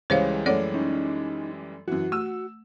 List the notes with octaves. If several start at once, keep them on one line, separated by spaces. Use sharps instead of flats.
C#2 E3 G3 G#3 C5 C#5 F5
F#2 A3 A4 C#5 D5 F#5
C#4 D#4
F#2 E3 F#4
A3 E6